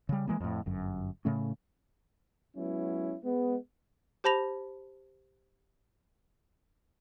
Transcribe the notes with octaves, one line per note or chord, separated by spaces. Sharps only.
C#3 G3
E3 G#3 A#3
F2 A2
G1 F#2
A2 C#3 A3 C#4
F#3 G#3 B3 C#4 E4
G#3 B3
G4 C5 A5 B5 A#6 F7